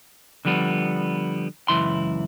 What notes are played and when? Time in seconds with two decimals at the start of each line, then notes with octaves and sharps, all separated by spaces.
0.45 D3 F3 G3 B3
1.68 C#2 F#2 E3 E4 C6